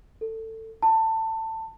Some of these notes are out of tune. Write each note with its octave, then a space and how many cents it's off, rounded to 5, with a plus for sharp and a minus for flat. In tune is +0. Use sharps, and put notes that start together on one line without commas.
A4 +20
A5 +20